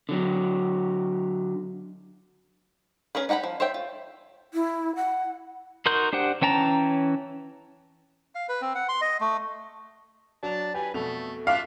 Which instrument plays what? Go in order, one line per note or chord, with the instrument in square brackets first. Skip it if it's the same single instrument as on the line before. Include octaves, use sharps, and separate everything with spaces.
[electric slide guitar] D3 F#3
[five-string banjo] C#4 G#4 A#4 B4
D#4 G4 F#5 G#5 B5
F3
C5 C#5 E5 G5
F4
[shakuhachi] E4
F#5
[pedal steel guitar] D#4 F#4 A#4 C6 G6
D4 G4 C5 F#5
E3 C#4 G5 A5 A#5
[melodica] F5
B4
C4
F#5
C6
D#5
A3
[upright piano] F#3 F7 [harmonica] D4 A5
[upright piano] G4 [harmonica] B4 G#5
[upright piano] F2 B2 F7 [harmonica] A3
[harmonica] A3 F4 E5 [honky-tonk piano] F5 [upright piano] A5 D6 F#6